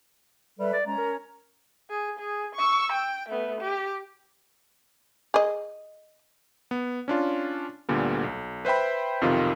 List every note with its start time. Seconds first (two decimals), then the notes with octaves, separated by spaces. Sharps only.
0.59 G3 A4 B4 E5
0.73 D5
0.86 G#3 C#4 A#5
0.98 A#4
1.90 G#4
2.19 G#4
2.55 C#6 E6
2.92 G5
3.29 A3 B3
3.61 G4
5.34 G#4 D#5
6.71 B3
7.08 C#4 D4 F4
7.89 D2 A#2 D3 G3 B3
8.24 B1
8.65 B4 C5 E5 G5 B5
9.21 B1 F2 C3 D#3 F4